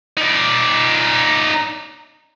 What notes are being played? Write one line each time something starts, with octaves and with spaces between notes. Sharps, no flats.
D#4 D5